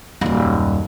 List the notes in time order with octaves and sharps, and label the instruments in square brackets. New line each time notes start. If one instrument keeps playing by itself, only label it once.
[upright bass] D#1 F#2